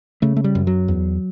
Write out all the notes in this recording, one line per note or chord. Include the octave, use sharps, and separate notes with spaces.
C#3 A3
A3
G3
F#2
F#3
E2